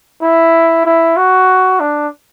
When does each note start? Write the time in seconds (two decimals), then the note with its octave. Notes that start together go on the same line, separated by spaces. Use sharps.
0.22 E4
0.85 E4
1.17 F#4
1.80 D4